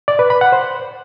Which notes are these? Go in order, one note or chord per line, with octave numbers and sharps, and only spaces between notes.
D5
B4
B5
F#5
C5